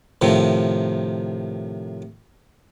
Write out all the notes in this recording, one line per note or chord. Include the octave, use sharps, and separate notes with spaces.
A2 C3 D#3 F3